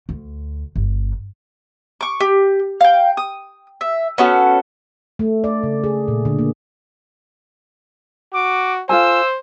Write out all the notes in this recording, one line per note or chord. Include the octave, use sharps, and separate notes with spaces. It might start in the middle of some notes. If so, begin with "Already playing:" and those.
D2
G1
C#6 D6
G4
F5 G5
D#6
E5
B3 C#4 F#4 A4
A3
D5
C#3
G#4
A#2
D3
A#3
F#4 D6
F4 A4 C5 G#5 E6